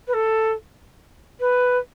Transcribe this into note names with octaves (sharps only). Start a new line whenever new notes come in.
B4
A4
B4